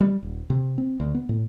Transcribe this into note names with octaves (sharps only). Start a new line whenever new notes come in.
G3
D#1
C3
C4
D2
B3
A2